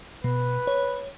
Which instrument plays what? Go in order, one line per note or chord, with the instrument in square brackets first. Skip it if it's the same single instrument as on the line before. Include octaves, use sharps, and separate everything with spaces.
[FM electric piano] B2 [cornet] B4
[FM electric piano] C#5